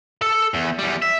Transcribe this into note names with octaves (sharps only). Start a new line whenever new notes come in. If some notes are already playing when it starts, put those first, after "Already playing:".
A4
E2
E2 G3
E5